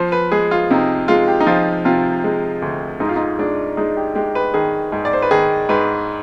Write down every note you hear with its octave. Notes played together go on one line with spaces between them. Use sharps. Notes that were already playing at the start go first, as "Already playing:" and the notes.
Already playing: F3 C5
B4
G#3 G#4
F4
C3 D#4
G#3 F4
G4
D#4
F3 F4
C3 F4
G#3
D2
G#2 D#4
F4
D#4
G#3 D4
G#3 D#4
G4
G#3 G4
B4
D#3 G#4
G#2
D5
C5
B4
D#3 G#4
G#2 B4